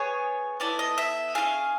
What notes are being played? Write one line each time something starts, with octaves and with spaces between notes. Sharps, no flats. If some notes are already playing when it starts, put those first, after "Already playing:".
Already playing: B3 G#4 C#5
B3 E4 A4 D5
D#5
E5
C#4 F4 G#4 F5